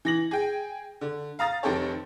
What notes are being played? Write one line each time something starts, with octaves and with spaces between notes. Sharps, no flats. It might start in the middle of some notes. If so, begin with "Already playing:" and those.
E3 A#6 F#7
G#4 G5
D3
F5 A#5 D#6 A6
F1 D#3 C4 G4 A4 C#5